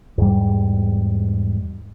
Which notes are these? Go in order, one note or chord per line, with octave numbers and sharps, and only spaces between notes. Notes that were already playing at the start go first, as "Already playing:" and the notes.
E2 G#2 G3